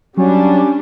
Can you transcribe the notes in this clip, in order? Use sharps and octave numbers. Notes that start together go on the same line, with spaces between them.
F#3 G3 C#4 D4